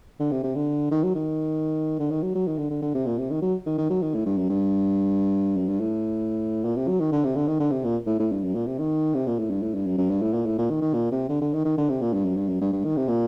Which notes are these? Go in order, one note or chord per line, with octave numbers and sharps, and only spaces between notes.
D3
C3
C3
D3
D#3
F#3
D#3
D3
D#3
F#3
F#3
D#3
D3
D3
D3
C3
A#2
C3
D#3
F#3
D#3
D#3
F#3
D#3
A2
G2
F#2
G2
F#2
G2
A2
A#2
C3
F#3
D#3
D3
C3
D3
D#3
D3
C3
A#2
A2
A2
G2
F#2
A#2
C3
D#3
C3
A#2
A2
G2
A2
G2
F#2
F#2
G2
A2
A#2
A2
A#2
D#3
D#3
A#2
C3
D3
D3
D#3
D#3
D3
C3
A#2
G2
F#2
G2
F#2
G2
G2
D#3
C3
A#2